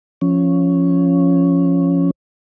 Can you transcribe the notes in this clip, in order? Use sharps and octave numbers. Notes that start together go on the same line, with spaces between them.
F3 C#4